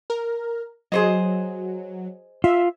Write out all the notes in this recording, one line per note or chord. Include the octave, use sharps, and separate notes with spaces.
A#4
F#3 G#4 C5 D#5
F4 E5